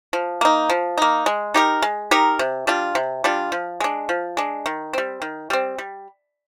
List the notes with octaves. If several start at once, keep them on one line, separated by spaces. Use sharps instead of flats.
F3
A#3 D#4
F3
A#3 D#4
G#3
D#4 G4 A#4
G#3
D#4 G4 A#4
C3
G3 D4 F4
C3
G3 D4 F4
F3
G#3 D4
F3
G#3 D4
D#3
G3 C4
D#3
G3 C4
G3